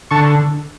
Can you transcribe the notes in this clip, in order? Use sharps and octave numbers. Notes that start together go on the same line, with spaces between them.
D3 A5 C#6